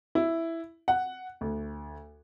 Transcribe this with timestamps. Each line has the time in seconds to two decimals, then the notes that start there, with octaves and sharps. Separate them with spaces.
0.15 E4
0.88 F#5
1.41 D2